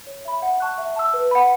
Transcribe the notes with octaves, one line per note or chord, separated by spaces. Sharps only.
C#5
E5 B5
F#5
A5 C#6 F#6
E5
A5 E6
B4
F#5 B5